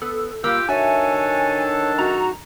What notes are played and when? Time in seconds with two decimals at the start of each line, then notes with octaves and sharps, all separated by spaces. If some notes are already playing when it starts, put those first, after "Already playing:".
0.02 B3 A4
0.44 G3 A#3 F4 G4 E6
0.69 D#3 D4 F#4 A4 C#5 E5 G#5
1.99 F#2 D#4 F#4 G#4 A#5